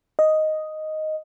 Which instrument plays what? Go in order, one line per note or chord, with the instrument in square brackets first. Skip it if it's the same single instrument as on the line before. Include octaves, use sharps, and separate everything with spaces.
[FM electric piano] D#5